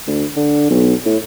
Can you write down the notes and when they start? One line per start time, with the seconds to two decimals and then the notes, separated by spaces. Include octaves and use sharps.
0.07 D2
0.36 D3
0.70 B1
1.05 A2